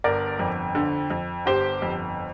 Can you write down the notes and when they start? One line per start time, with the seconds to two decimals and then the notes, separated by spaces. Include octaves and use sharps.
0.04 G1 A#4 D5
0.39 F2
0.75 D3
1.10 F2
1.46 G1 G4 C5
1.82 F2